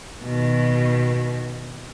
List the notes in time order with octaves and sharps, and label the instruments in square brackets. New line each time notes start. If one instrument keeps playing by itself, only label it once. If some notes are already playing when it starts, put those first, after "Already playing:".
[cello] B2 D#3